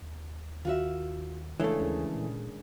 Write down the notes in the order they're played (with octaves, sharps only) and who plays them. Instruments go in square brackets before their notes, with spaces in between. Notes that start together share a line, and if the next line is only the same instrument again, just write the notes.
[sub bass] D#2
[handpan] D#3 [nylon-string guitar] F4 F#4 E5
[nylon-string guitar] C#3 A4 [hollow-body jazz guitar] E3 A3 [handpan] G#3 D4
[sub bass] D#2 [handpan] C#4 G#4 A#4
[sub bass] A#2